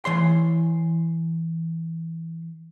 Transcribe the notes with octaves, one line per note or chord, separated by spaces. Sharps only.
E3 C#5 C6